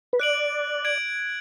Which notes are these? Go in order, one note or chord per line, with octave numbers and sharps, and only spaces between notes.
B4
D5 F#6 D7 F#7
G#6 D7 F#7